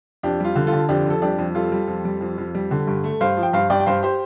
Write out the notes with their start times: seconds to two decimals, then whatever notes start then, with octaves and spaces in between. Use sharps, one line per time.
0.23 F2 D4 G4
0.40 G3 F4
0.56 D3
0.67 F4 A4
0.73 D3
0.89 F2 D4 G4
1.06 F2 A4
1.22 G3 D4 G4
1.38 F2
1.55 G3 F4 A4
1.72 G3
1.88 F2
2.05 G3
2.21 F2
2.38 F2
2.55 G3
2.71 D3
2.87 G2
3.04 A3
3.21 G2 C5 F5
3.37 F3
3.43 G5
3.53 G2 C5 F5
3.70 G2 D5 G5
3.80 G5
3.86 G2 C5 F5
4.03 G4 C5